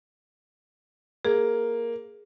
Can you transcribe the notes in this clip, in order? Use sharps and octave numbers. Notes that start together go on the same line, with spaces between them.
A#3 G#4